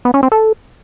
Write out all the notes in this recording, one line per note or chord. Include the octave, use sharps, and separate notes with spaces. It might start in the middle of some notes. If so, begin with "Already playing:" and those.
B3
C#4
C4
A4